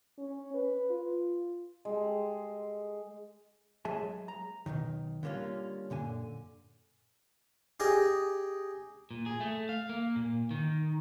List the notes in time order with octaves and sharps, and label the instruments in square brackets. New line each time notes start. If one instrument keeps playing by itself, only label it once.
[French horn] C#4
B4
F4
[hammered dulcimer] G#3 G4 A4
[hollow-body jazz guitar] F#3 G#3 G#4 E5 G#5 A5
A#5
B1 F#2 B2 D#3
D3 G3 A#3 C#4 F4
F#2 A#2 D3 G#5
[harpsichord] G4 G#4 D#5
[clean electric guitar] A#2
G#4
A3
F5
A#3
A#2
D#3